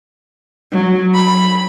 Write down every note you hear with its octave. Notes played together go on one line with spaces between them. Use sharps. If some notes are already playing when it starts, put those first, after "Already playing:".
F#3
B5